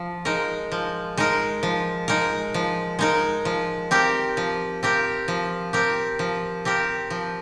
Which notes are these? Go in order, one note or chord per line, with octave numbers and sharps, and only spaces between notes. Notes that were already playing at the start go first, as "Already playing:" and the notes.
Already playing: F3
G#3 D#4 A#4
F3
G#3 D#4 A#4
F3
G#3 D#4 A#4
F3
G#3 D#4 A#4
F3
C4 G4 A#4
F3
C4 G4 A#4
F3
C4 G4 A#4
F3
C4 G4 A#4
F3